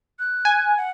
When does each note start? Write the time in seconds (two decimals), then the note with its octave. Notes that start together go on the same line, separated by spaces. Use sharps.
0.19 F#6
0.45 G#5
0.77 F#5